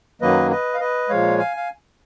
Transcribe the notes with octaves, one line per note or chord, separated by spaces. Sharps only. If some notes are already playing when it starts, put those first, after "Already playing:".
F#2 D#3 F#3 A#3 B4 D#5
B4 D#5
F5
B4 D#5
A#2 F3 G#3 C#5 F5
F5 G#5
F5